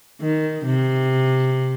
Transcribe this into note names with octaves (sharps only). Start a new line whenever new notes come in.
D#3
C3